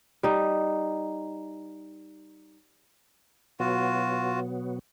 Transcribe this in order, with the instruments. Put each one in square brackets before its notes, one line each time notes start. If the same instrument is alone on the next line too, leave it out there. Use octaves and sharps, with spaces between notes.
[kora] G3 D#4
[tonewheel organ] B2 F#3 B3 [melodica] F4 F#4